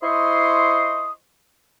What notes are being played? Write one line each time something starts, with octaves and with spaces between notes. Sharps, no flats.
E4 C5 D#5 C6 C#6 D#6